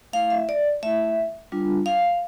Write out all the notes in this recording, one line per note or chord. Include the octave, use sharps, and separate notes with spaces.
A3 E4 F5
E5
D5
A3 E4 E5
G3 D4 F4
F5